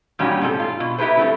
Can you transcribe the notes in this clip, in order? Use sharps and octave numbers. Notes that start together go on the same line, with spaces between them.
A#2 G3 C#4 D#4 F#4 G4
G#2 C3 A4
F4
B2
D#4 E4 G4 G#4 B4 C5
G2 D3 A3 C4